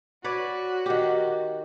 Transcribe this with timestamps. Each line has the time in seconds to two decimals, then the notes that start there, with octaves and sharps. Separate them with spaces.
0.24 F#4 B4 C#5 D5
0.86 D#3 G4